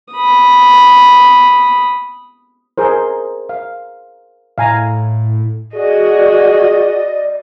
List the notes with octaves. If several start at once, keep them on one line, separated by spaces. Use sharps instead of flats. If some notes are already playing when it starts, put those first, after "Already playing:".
B5 D#6
G#4 A#4 C5
F5
A2 F5 G#5 A#5
F#4 G#4 D5 D#5